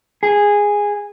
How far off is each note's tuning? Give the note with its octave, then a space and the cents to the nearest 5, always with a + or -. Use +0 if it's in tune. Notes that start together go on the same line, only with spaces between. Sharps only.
G#4 -10